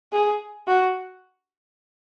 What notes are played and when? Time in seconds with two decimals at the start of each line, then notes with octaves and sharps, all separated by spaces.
0.13 G#4
0.68 F#4